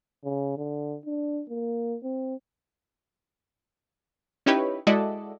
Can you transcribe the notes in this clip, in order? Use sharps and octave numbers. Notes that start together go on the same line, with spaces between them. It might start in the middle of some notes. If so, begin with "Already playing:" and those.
C#3
D3
D4
A#3
C4
C#4 D#4 E4 G4 B4 C#5
G#3 E4 F#4 A4 D5 D#5